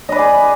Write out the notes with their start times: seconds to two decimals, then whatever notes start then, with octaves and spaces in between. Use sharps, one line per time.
0.09 D#5
0.12 B4
0.16 D5
0.19 G#4